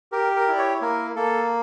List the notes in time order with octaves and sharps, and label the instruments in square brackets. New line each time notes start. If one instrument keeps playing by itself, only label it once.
[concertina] G4 A#4
A#4
E4 D5
C#5
A#3 A#4
A#3 A4